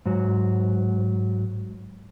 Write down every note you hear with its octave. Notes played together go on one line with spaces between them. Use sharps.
G#2 F#3